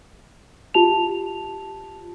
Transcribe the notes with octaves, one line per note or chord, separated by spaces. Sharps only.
F4 G4 A5 F7